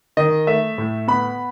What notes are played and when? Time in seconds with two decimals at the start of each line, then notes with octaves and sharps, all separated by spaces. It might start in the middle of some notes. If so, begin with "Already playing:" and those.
0.17 D#3 D#5
0.47 A3 E5
0.78 A2
1.08 B3 B5